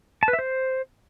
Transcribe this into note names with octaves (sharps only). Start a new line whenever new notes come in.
A5
B4
E5
C5